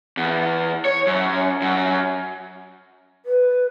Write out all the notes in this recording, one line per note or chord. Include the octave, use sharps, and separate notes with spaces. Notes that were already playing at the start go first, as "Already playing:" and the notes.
E2
C#5
F#2
F#2
B4